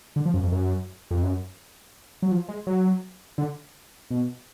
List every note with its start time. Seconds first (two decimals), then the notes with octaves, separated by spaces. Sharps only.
0.16 D3
0.25 F3
0.34 F#2
0.43 F2
0.52 F#2
1.11 F2
1.23 F#2
2.22 F#3
2.31 F3
2.49 G#3
2.67 F#3
3.38 D3
4.11 B2